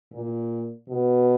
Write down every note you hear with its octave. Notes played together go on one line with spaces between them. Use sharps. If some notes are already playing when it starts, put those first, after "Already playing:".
A#2
B2